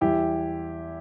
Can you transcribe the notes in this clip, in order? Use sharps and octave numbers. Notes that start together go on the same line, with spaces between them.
E2 E3 G3 E4 G4